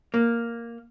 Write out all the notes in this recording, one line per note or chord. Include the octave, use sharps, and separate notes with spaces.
A#3